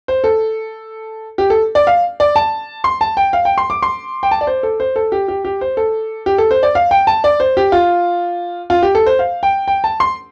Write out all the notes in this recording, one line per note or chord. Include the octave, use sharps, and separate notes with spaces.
C5
A4
G4
A4
D5
F5
D5
A5
C6
A5
G5
F5
G5
C6
D6
C6
G5
A5
D5
C5
A4
C5
A4
G4
G4
G4
C5
A4
G4
A4
C5
D5
F5
G5
A5
D5
C5
G4
F4
F4
G4
A4
C5
F5
G5
G5
A5
C6